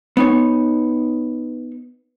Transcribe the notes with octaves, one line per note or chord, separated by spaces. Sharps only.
B3 D#4 C#5